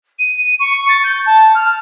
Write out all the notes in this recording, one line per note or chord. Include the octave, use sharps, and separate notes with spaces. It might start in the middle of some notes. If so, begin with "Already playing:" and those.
D#7
C#6
A6
G6
A5
F6